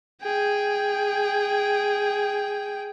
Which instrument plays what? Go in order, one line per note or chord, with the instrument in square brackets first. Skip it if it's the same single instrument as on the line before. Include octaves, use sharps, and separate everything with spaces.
[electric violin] G#4 G5